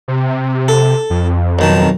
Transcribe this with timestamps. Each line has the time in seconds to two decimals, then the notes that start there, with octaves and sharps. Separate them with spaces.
0.08 C3
0.68 A4
1.10 F2
1.59 B1 D#3 A5